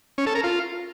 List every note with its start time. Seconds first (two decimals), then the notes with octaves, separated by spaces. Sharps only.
0.18 C#4
0.26 A4
0.35 A#4
0.43 F4